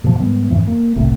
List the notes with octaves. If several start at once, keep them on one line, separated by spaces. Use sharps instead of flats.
F#2 A#2 E3 F3
G#2 D#3 G3 B3
F2 G#2 E3
A#3
F#1 C2 A2 C3